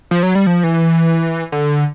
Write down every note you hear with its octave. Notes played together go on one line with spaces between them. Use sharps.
F3
F#3
G3
F3
E3
D3